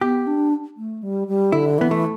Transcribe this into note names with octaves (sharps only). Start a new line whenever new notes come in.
B3 G4
D4
A3
G3
G3
D3 E4
E3 B3
A3